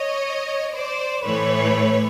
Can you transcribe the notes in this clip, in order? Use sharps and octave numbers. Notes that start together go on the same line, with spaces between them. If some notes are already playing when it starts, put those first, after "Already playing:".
Already playing: C#5 D#5
C5 D5
A2 E3 A3 B4 C#5